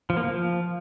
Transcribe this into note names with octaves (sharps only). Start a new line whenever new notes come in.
F3
A#3
F3